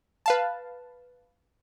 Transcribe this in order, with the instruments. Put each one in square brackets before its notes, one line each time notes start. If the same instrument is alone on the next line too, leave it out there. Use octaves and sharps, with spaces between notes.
[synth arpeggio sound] B4 F5 A5